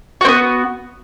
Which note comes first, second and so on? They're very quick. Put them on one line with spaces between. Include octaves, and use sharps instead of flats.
F#4 C4 B3